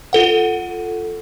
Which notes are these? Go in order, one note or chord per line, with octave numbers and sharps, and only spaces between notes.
F4 A4 F#5